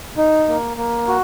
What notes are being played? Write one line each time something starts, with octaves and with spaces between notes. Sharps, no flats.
D#4
A#3
A#3
F#4